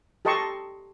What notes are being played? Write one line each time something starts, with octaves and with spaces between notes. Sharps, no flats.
G4 A4 D#5 A5 C6 C#6